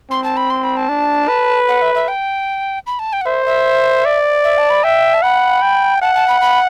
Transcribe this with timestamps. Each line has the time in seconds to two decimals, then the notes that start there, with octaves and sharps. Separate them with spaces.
0.10 C4 C6
0.24 A5
0.37 B5
0.50 C6
0.64 B5
0.77 A5
0.89 D4
1.28 B4
1.68 F#5
1.82 E5
1.95 E5
2.08 G5
2.87 B5
2.99 A5
3.13 G5
3.21 F#5
3.26 C5 E5
3.46 E5
4.05 D5
4.44 E5
4.58 A5
4.70 B5
4.84 E5 G5
5.14 A5
5.22 F#5 B5
5.62 G5
6.01 F#5 A5
6.15 A5
6.28 B5
6.41 B5